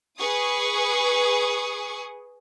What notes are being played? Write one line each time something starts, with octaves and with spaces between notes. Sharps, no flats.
G#4 B4 C#6 D#6